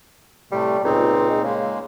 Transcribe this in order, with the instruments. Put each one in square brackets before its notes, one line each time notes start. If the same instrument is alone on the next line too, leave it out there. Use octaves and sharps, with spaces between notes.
[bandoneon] A2 C3 A3 [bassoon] G3
[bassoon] C#2 [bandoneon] A#2 C4 D#4
[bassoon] G#3
[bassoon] C#3 [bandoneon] G#3 A#3